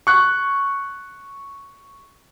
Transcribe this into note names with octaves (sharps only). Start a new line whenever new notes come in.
C#6 F#6